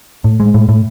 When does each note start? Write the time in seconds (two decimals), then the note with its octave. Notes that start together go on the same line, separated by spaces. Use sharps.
0.24 A2
0.40 G#3
0.54 A2
0.69 A2